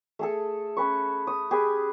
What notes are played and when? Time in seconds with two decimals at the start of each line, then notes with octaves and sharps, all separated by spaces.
0.19 A3 G#4 A4
0.77 C#4 B4 C#6
1.27 D#6
1.51 G4 G#4 B4 G#5